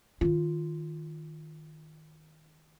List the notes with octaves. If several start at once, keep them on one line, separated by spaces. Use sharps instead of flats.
D#3 F4